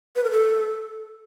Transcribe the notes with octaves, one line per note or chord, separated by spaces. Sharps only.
B4
A#4
A4